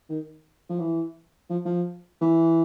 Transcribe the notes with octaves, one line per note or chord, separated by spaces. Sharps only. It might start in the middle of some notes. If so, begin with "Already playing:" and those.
D#3
F3
E3
F3
F3
E3